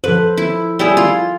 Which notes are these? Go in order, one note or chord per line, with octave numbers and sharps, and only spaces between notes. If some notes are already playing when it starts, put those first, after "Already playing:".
F3 A4 B4 C5
E4
G3 E4 G#4
F4